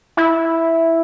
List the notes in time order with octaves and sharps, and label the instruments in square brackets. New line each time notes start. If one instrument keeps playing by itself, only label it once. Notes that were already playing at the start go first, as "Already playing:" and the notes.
[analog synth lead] E4